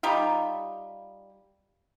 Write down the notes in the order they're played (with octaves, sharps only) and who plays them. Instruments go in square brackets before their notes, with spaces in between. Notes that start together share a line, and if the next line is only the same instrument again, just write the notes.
[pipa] G3 D#4 F4